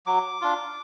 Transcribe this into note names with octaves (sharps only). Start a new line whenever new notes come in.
F#3 D6
D4 F4